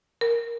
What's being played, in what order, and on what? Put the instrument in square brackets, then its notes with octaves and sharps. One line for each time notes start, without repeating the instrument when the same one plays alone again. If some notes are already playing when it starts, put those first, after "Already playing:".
[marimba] A#4